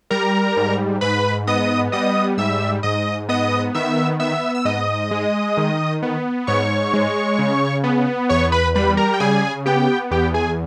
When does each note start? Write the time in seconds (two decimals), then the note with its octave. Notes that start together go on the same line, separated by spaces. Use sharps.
0.11 G3 A#4 A#5
0.57 G#2
1.01 G#2 B4 B5
1.47 B3 D#5 D#6
1.92 G3 D#5 D#6
2.38 G#2 E5 E6
2.83 G#2 D#5 D#6
3.29 B3 D#5 D#6
3.75 D#3 E5 E6
4.20 B3 E5 E6
4.55 E6
4.65 G#2 D#5 D#6
5.11 G#3
5.57 D#3
6.03 B3
6.47 G#2 C#5 C#6
6.94 G#3
7.39 C#3
7.84 B3
8.29 E2 C#5 C#6
8.52 B4 B5
8.75 G3 B4 B5
8.97 A#4 A#5
9.14 G5
9.20 C#3 G#4 G#5
9.66 B3 G4 G5
10.11 E2 G4 G5
10.34 G#4 G#5